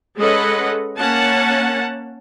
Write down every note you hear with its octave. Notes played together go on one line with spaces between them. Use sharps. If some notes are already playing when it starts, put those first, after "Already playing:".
G#3 C#4 A4 B4 D#5 F#5
A#3 C#4 F#5 A5